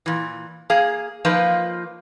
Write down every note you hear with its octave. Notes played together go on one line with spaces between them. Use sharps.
A#2 E3
A#3 G#4 F5
F3 A#3 D#4 F4 B4